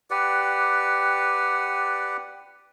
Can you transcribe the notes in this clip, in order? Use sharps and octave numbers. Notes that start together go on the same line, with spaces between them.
G4 B4 D5 F#5